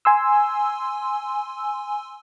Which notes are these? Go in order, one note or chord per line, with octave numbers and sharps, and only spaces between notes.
G#5 C6 E6